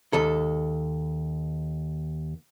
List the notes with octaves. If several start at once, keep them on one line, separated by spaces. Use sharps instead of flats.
D#2 A4